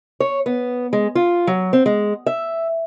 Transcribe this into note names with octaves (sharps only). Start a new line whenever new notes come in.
C#5
B3
G#3
F4
F#3
C4
G#3
E5